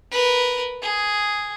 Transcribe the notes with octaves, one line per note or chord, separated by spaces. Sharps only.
A#4 B4
G#4